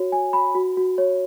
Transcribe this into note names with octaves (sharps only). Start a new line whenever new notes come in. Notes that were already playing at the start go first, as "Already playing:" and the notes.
Already playing: F#4 C#5
G#5
B5
F#4
F#4
C#5